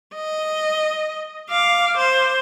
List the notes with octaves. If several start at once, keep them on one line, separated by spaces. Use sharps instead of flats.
D#5
F5 D6
C5